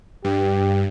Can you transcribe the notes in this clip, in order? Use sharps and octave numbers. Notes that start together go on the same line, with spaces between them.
G2 G4